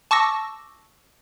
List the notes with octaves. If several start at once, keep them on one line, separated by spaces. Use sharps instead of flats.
A5 C#6 D6 E6 A#6